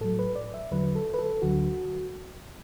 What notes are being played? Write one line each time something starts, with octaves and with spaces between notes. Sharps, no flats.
A2 F#3 A4
B4
D5
E5
E2 D3 F#3 B4
A4
B4
A4
D2 D3 F#3 F#4